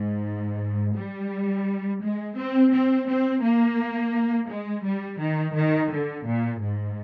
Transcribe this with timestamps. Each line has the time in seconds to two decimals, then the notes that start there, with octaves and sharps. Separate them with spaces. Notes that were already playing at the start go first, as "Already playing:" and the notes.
Already playing: G#2
0.96 G3
2.02 G#3
2.37 C4
2.72 C4
3.08 C4
3.43 A#3
4.49 G#3
4.84 G3
5.20 D#3
5.55 D#3
5.91 D3
6.26 A#2
6.61 G#2